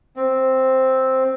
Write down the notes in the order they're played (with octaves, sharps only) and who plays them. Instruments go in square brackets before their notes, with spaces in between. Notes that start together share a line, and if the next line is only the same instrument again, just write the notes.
[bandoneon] C4